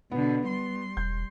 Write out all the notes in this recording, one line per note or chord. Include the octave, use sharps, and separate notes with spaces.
B2 D3 B3
G3 C6
E1 G6